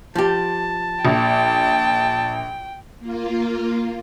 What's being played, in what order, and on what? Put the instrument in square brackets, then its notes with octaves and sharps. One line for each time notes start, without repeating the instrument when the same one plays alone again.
[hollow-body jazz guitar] F3 G4 [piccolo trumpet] A5
[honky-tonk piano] A#1 [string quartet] G5
[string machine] A#3 F4